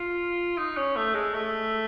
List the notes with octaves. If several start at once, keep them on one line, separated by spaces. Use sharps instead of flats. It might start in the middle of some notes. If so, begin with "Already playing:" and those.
Already playing: F4
D#4
C#4
A3
G#3
A3